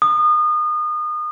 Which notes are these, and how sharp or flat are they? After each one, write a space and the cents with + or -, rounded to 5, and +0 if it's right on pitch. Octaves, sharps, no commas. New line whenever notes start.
D#6 -30